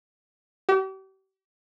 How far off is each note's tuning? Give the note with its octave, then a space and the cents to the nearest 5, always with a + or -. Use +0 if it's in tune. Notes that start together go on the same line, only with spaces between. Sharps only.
G4 -40